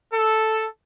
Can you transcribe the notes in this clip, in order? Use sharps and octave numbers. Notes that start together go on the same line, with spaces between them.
A4